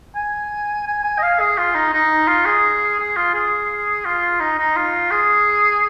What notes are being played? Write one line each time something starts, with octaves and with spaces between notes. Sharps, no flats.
G#5
G#5
G#5
D#5
F5
G#4
F4
D#4
D#4
F4
G#4
G#4
F4
G#4
F4
D#4
D#4
F4
G#4